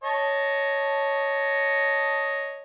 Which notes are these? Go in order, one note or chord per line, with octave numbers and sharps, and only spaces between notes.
C#5 D#5 A5